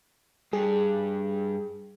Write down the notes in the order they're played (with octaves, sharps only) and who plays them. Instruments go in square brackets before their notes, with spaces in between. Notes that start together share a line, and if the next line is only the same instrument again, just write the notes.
[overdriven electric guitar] G2 [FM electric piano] G#4